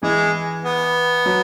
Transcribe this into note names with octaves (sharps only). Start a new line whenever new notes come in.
E3 G#3
B3
F#3